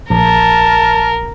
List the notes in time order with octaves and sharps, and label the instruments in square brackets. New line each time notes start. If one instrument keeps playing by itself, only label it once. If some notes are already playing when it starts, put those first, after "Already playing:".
[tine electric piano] A#1 [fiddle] A#4 [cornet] A5